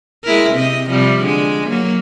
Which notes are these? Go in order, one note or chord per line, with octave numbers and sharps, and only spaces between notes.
G#3 E4 A#4
C3 C4 D#5
C3 F3 G3
D3 G#3
F#3 A#3